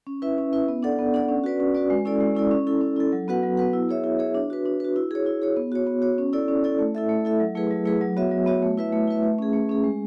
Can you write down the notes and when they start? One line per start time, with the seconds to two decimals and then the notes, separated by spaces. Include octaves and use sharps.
0.07 C#4
0.22 E4 B4 E5
0.38 C#4
0.53 E4 B4 E5
0.68 B3
0.83 D4 A4 D5 F#5
0.99 B3
1.14 D4 A4 D5 F#5
1.28 C#4
1.44 F#4 B4 D5
1.60 C#4
1.75 F#4 B4 D5
1.90 G#3
2.05 C#4 E4 A4 D5
2.20 G#3
2.35 C#4 E4 A4 D5
2.51 C#4
2.67 E4 A4
2.81 C#4
2.96 E4 A4
3.12 F#3
3.28 B3 F#4 B4 F#5
3.43 F#3
3.57 B3 F#4 B4 F#5
3.73 E4
3.89 G#4 C#5 E5
4.04 E4
4.19 G#4 C#5 E5
4.34 D4
4.50 F#4 B4
4.66 D4
4.80 F#4 B4
4.96 E4
5.11 G#4 C#5
5.26 E4
5.42 G#4 C#5
5.56 B3
5.72 F#4 C#5
5.87 B3
6.02 F#4 C#5
6.18 C#4
6.33 E4 A4 D5
6.48 C#4
6.64 E4 A4 D5
6.79 A3
6.95 E4 A4 E5
7.09 A3
7.25 E4 A4 E5
7.40 F#3
7.55 A3 E4 G#4 B4
7.71 F#3
7.85 A3 E4 G#4 B4
8.01 F#3
8.17 B3 F#4 C#5 E5
8.31 F#3
8.46 B3 F#4 C#5 E5
8.62 A3
8.78 E4 B4 E5
8.92 A3
9.08 E4 B4 E5
9.23 A3
9.38 C#4 G#4
9.53 A3
9.69 C#4 G#4
9.84 G#3